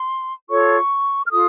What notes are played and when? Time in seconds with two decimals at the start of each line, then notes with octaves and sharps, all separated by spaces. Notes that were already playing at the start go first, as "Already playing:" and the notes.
Already playing: C6
0.48 F4 A4 C#5 C#6
1.25 F6
1.30 F4 A4 D#6